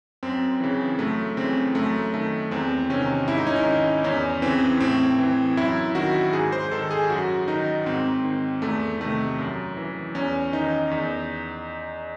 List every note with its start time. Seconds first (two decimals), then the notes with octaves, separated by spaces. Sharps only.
0.23 F#2 C4
0.60 C#3 E3
0.99 F#2 A3
1.37 C#3 E3 C4
1.75 F#2 A3
2.14 D#3 A3
2.51 E2 C4
2.90 C3 D#3 C#4
3.28 G#2 E4
3.37 D#4
3.47 C#4
3.56 D#4
3.66 D#3
4.04 E2 C#4
4.42 C#3 E3 C4
4.80 A2 C4
5.18 E3
5.57 F#2 E4
5.95 D#3 F#4
6.33 G#2 G#4
6.52 C5
6.72 D#3 A4
6.91 G#4
7.09 F#2 F#4
7.48 D#3 D#4
7.86 G#2 C4
8.24 D#3
8.62 E2 A3
9.00 C3 D#3 A3
9.39 F#2
9.77 E3
10.15 E2 C#4
10.53 D#3 D#4
10.91 E2